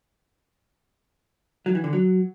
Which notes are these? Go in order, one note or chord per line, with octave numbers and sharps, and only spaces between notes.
F#3
E3
D3
F#3